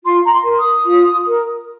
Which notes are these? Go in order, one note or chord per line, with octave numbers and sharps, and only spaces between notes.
F4 C6
A#5
C6
A#4
D#6
F4
A#4